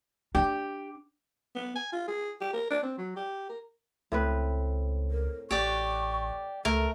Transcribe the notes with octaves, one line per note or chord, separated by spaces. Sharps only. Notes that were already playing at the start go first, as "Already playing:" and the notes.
D4 G4
B3
G#5
F4
G#4
G4
A#4
D4
C4
F#3
G4
A#4
C#2 A2 C4 B4
A#4
A1 G4 D5 C#6
C#2 A3 A4 A#4